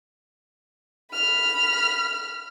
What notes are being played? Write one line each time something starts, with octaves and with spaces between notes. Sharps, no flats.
B5 F6